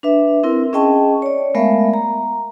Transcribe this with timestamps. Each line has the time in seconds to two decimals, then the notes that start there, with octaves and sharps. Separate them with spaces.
0.03 D4 B4 E5
0.43 C4 E4 A#4
0.73 C#4 G#4 D#5 G5 A5 C#6
1.22 C#5 D5
1.55 G#3 A3 B3 A#4 E5 F5
1.93 A#5